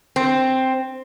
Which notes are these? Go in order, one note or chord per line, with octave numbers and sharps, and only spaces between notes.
C4